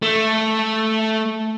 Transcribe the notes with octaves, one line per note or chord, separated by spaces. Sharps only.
A3